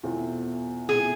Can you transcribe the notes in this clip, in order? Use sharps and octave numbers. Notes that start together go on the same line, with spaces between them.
E2 B2 A3 C4 F4
E2 B2 A3 C4 F4 G#4